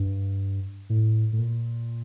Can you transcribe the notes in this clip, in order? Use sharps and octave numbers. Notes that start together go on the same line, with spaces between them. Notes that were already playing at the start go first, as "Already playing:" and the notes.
Already playing: G2
A2
A2
A#2